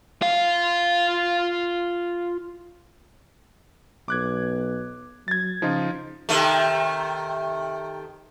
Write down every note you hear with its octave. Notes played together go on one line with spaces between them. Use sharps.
F4 F5
B1 D6 F#6 G#6
F#3 G#6 A6
C#3 F3 D#4 F4
C3 D#3 A3